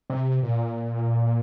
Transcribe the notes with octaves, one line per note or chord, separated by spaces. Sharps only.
C3
A#2